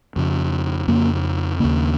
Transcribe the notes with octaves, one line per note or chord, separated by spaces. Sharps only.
F2 C#3
F2 C#3 A#3
D#2 C#3 A#3